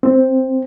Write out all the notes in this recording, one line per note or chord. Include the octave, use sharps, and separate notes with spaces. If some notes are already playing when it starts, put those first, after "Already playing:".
C4